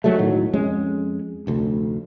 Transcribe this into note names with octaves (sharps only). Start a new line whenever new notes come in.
D2 F#3 G#3 A3
E1 A2 D#3 F#3
F2 G#3 C#4
F1 D2